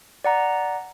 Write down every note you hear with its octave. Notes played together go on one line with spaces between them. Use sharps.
D5 F#5 A#5